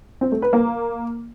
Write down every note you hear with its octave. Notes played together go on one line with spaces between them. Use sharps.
C4
A3
B4
A#3